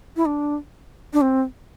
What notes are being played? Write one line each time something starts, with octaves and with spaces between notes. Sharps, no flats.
E4
D4
D4
C4